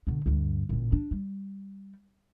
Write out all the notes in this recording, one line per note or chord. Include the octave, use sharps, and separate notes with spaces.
B2 D3
D2 G2
A1 A#2
D4
G3